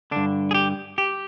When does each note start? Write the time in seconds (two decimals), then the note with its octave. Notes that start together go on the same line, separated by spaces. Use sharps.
0.11 G2 D3 D4
0.51 G#4
0.54 G4
0.98 G4